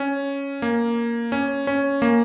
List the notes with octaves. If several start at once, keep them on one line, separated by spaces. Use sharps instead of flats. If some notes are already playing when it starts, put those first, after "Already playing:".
Already playing: C#4
A#3
C#4
C#4
A#3